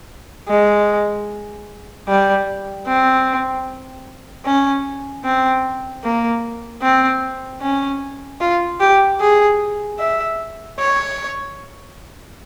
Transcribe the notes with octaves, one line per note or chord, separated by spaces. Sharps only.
G#3
G3
C4
C#4
C4
A#3
C4
C#4
F4
G4
G#4
E5
C#5